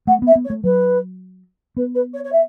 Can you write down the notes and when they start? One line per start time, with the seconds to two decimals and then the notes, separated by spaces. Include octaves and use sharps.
0.07 A3 F#5
0.22 B3
0.27 E5
0.35 B3
0.45 C#5
0.50 A3
0.64 F#3 B4
1.77 B3 B4
1.95 B4
2.13 C#5
2.24 C#5
2.32 E5